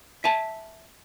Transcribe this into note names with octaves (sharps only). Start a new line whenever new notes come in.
E5 G#5 A5